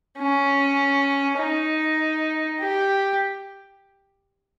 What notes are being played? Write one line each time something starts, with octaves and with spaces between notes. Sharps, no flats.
C#4
D#4
G4